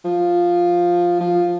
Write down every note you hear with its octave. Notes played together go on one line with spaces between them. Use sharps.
F3
F3